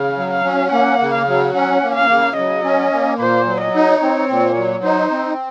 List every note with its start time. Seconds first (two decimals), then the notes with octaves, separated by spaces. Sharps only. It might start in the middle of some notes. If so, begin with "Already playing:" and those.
Already playing: C#3 F5
0.17 F#3
0.31 F5
0.45 C#4
0.72 A#3 F#5
1.00 C#3
1.14 F5
1.28 F#3
1.54 C#4 F#5
1.83 A#3
1.96 F5
2.10 C#3
2.37 F#3 D#5
2.64 C#4
2.92 A#3
3.19 A#2 C5
3.46 F#3
3.61 D#5
3.75 D#4
4.01 C4 C#5
4.29 A#2
4.57 F#3
4.84 D#4 C5
5.11 C4